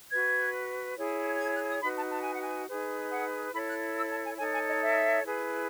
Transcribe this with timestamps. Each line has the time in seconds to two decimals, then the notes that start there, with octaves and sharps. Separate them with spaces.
0.11 F#4 B4 G#6
0.97 E4 G#4 C#5
1.40 G#6
1.53 F#6
1.69 D#6
1.82 D#4 F#4 B4 B5
1.96 A5
2.10 A5
2.21 G#5
2.32 F#5
2.41 G#5
2.68 D#4 G#4 B4
3.10 F#5
3.52 E4 A4 C#5 B5
3.67 F#6
3.95 E6
4.09 A5
4.24 G#5
4.37 D#4 A4 C#5 G#5
4.52 G#5
4.66 D#5
4.80 E5
5.24 E4 G#4 B4